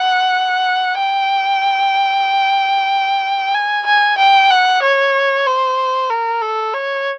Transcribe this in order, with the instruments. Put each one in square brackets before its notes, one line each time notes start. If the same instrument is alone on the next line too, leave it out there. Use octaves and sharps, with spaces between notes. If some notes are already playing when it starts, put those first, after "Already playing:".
Already playing: [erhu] F#5
G5
G#5
G#5
G5
F#5
C#5
C5
A#4
A4
C#5